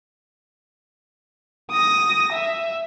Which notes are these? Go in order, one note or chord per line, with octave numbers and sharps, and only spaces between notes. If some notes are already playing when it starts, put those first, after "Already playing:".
D#6 A#6
E5